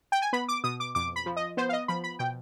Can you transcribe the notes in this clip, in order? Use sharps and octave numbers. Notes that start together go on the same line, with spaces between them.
G5
G#5
B3 B5
D6
B2 D#6
D6
F2 D6
B5
F3
D#5
B3 C5
F5
D#5
F3 B5
B5
B2 G5